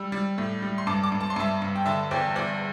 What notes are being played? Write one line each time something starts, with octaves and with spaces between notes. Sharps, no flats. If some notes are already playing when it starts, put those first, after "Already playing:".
Already playing: G3 E6
G3
A2
G3
C6
G2 A5 D6
A5 D6
G2
A5
C6
G2 E5 A5
G2
G5
D3 E5 A5
E2 D5 G5
E2 D5